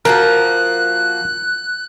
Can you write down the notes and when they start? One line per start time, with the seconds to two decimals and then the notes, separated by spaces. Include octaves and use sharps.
0.05 F3 A#3 F#4 A#4 F#6